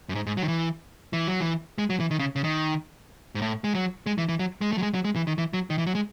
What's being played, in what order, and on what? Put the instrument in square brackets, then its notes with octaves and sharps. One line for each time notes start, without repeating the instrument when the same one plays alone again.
[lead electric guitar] F#2
G#2
G#2
F#3
D#3
E3
E3
F#3
E3
G#3
F#3
E3
D#3
C#3
C#3
D#3
G#2
A2
G#3
F#3
G#3
E3
E3
F#3
G#3
A3
F#3
G#3
F#3
G#3
E3
D#3
E3
F#3
D#3
E3
F#3
G#3